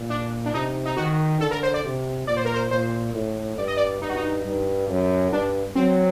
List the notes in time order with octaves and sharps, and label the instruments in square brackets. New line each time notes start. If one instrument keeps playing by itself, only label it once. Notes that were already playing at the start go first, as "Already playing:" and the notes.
Already playing: [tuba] A#2
[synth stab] D4
D4
[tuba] C3 [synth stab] D#4
[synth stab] D#4
[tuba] D#3 [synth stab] F#4
[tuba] D3 [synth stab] A4
[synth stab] A#4
C5
D5
[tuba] C3
[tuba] A#2 [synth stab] D5
[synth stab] C5
A#4
C5
[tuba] A#2 [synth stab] C5
[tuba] A2
[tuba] G2 [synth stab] D5
[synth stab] D#5
D5
[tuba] G2 [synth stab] D#4
[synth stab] F#4
D#4
[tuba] G2
F#2
[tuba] G2 [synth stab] D4
[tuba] F#3 [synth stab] C4